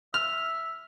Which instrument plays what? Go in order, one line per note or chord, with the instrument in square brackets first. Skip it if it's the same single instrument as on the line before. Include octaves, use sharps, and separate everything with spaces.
[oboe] E5 [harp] F6